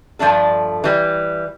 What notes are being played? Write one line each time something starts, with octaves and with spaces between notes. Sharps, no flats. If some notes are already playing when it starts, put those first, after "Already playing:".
G2 F3 A3 D4 A4
E3 G3